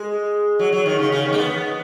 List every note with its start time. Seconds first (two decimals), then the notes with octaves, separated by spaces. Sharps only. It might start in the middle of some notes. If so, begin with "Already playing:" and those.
Already playing: G#3
0.59 F#3
0.72 F#3
0.86 D#3
0.99 C#3
1.12 C#3
1.26 D#3
1.33 A#3
1.38 B3